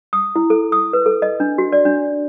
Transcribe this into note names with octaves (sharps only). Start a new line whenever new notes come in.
D#6
E4
A4
D#6
B4
A4
D#5
D4
F#4
D5
D4